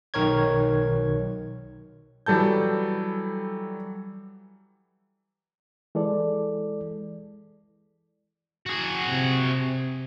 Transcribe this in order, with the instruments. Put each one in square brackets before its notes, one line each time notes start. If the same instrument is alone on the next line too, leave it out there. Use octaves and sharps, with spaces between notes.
[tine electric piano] B1 D#3 A#4 C#5 G#6
[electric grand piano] E3 F#3 G3 A4 A5 G6
[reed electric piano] E3 G#3 A4 D5
[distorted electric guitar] F#4 G#4
[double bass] C3